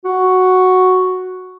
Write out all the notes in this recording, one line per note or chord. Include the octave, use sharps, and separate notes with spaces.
F#4